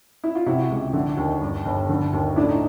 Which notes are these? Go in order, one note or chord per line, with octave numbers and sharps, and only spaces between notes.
E4
F4
C3 E4 F#4
C#2
D3
D#2
G2
G1
D3
D#2
A2 D4 E4
D#4